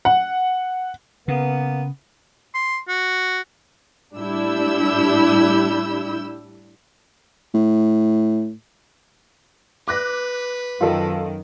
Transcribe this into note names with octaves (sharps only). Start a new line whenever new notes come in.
F#5
C#3 A#3 B3
C6
F#4
A2 G3 D4 E4 E6 G6
A2
B4 D6 F#6 A#6
F#2 D#3 F4 A4